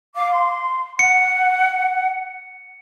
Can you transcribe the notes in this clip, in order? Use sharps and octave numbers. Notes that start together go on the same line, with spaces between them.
F5 D6
C6
F#5 C#7